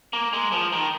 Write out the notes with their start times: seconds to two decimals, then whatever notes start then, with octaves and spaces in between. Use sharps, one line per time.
0.13 A#3
0.33 G#3
0.52 F3
0.73 D#3